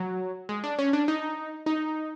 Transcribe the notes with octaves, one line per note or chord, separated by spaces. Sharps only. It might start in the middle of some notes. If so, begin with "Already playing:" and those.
Already playing: F#3
G#3
D4
C#4
D4
D#4
D#4